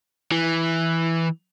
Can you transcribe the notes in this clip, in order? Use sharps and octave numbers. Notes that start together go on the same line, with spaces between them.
E3